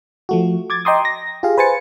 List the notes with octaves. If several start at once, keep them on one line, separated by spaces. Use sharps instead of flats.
F3 A3 F#4
D6 G#6 A6
D#5 G5 A#5 C6 D6 D#6
A#6
F4 G4 G#4 F5
B4 C5 G#5 A6 C#7